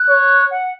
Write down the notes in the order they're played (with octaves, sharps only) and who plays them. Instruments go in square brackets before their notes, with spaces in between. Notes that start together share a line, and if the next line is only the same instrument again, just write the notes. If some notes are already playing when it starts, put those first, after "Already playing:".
Already playing: [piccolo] F#6
[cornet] C#5
[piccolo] F#5